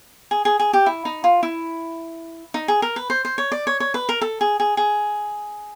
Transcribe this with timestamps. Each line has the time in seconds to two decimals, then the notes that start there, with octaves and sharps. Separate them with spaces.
0.31 G#4
0.45 G#4
0.59 G#4
0.73 G4
0.86 E4
1.05 D#4
1.24 F4
1.43 E4
2.54 D#4
2.68 G#4
2.82 A#4
2.96 B4
3.10 C5
3.25 C5
3.38 C#5
3.52 D5
3.67 C#5
3.80 C#5
3.94 B4
4.09 A#4
4.21 A4
4.41 G#4
4.60 G#4
4.77 G#4